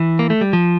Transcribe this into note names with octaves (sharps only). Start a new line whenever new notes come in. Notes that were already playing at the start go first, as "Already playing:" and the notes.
Already playing: E3
A#3
A3
G3
F3